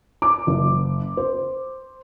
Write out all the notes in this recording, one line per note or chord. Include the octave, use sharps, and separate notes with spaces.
D6
F#1
C5